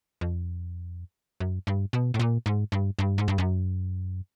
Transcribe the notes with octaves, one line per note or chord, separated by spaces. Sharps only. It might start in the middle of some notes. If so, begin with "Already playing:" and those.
F2
F#2
G2
B2
A2
A#2
G#2
G2
G2
G#2
G2
F#2